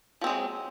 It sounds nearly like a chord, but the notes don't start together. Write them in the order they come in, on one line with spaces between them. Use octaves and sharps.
F3 C4 G#3 F#3